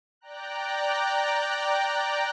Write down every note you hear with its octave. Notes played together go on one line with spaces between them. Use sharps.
D5 G5 A#5 F#6